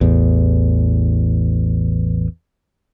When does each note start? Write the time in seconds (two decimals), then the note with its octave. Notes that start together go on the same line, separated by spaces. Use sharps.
0.01 A1 E2